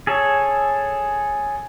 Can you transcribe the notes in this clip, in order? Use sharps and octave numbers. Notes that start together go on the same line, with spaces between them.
G#4 A4 C#5